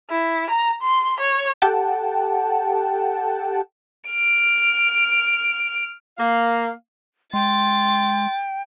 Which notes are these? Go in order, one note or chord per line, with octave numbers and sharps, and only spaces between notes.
E4
A#5
C6
C#5
G4 A4 F#5 G5 A5
F6 D7
A#3 F5
G#3 G5 C6 A6